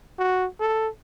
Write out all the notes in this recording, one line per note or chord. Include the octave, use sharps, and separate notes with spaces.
F#4
A4